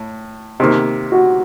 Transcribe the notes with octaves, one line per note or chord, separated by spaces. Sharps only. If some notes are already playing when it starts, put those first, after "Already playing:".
Already playing: A2
C3 D#3 A#3
F#4